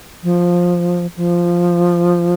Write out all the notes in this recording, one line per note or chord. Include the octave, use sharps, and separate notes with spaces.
F3
F3